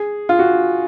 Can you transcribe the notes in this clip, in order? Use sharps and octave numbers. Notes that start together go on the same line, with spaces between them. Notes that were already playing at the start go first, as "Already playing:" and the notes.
Already playing: G#4
F4
F#4